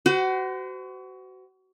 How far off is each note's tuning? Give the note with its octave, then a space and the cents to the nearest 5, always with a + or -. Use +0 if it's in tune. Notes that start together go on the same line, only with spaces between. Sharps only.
F#4 +25 C5 -40